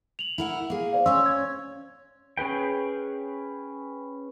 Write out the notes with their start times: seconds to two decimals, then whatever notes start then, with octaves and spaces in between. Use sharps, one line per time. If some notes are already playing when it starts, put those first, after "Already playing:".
0.19 F7 F#7
0.38 E4 A#4 F#5
0.70 A#3 G#4
0.93 C5 D5 F5
1.06 C#4 C#5 C6 E6
1.26 G#6
2.37 C#4 G#4 B4 G5